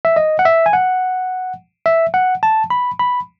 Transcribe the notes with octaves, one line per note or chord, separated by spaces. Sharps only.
E5
D#5
F#5
E5
G#5
F#5
E5
F#5
A5
B5
B5